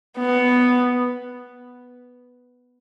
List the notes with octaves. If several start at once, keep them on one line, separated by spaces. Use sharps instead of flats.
B3